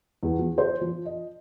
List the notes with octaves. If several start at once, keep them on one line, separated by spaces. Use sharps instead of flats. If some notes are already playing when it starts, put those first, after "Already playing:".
E2
F3
C5
F3
D#5